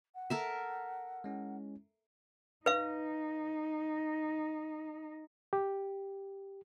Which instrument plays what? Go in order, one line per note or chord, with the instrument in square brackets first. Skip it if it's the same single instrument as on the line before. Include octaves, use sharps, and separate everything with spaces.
[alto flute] F#5
[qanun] A4 A#4 E5
[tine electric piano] G#3 C#4 E4
[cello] D#4 [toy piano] B4 F5
[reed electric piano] G4